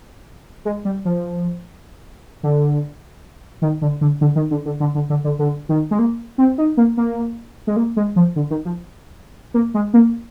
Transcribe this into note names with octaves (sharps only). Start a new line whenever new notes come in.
G#3
G3
F3
D3
D#3
D3
D3
D3
D#3
D3
D3
D3
D3
D3
D3
D3
D#3
G#3
A#3
C4
D#4
A#3
A#3
G#3
A#3
G#3
F3
D3
D#3
F3
A#3
G#3
A#3